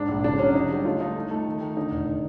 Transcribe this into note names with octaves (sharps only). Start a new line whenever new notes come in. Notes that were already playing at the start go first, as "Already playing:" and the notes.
Already playing: G#2 D4
A#1
C#3 D4
F#3 C#4
D3 D#4
G3
A3 F4
A3 D#4
A3
A3
D#3
D#3
D3 D#4
F1